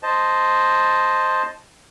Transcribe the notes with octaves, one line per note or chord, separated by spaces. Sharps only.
C5 D#5 A5